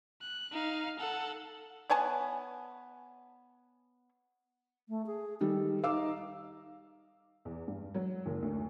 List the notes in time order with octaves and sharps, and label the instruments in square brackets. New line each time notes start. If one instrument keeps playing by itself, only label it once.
[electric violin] F#6
D#4 F5
A4 F#5
[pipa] B3 C#5 G#5 A5
[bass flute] A3
G#4
[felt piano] D#3 G3 [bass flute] A4
[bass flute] D#4 [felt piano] F5 D6 E6
[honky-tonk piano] E2
G2
F#3
F#1
D2